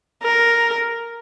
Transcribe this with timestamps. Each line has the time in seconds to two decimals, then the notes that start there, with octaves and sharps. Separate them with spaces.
0.23 A#4